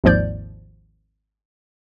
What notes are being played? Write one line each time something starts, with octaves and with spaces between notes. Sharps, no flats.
G#1 D#2 G#2 F3 D5 G6